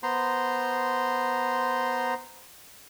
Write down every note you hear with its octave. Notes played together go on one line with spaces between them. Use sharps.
B3 C5 A#5 C6